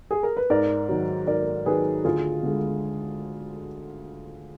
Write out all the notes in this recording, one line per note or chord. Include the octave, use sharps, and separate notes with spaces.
G#4
A#4
B4
G#2 A#4 D5
D#3 F#3
G#2 A#4 D5
D#3 F#3 G#4 B4
D2 F4 G#4
D3 G#3